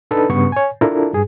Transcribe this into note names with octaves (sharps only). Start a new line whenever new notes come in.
D4 D#4 A4 B4
G2 C#3 B3 C#6
C#5 G#5
D4 E4 F4 A4 A#4
G2 G#4